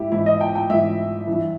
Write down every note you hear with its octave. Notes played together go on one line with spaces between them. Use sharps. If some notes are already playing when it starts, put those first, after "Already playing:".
Already playing: G#2 E4 G4 E5
G#2 E3 E4
D#5
G5
G5
G#2 E3 E5
G2 E3